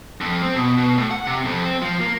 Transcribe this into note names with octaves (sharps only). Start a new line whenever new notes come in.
F2
C4
B2
B2
A2
F#5
C3
F2
C4
F3
A#3